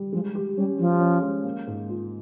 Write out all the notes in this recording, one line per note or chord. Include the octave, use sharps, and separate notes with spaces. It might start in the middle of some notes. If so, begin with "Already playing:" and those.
Already playing: G3
F3 G#3
G4
G3 C#4
F3 G4
C#4
G#3
A#3
G#2
F4